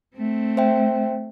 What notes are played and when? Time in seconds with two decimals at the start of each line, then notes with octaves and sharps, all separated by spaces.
0.16 A3 C4
0.57 C5 E5 G5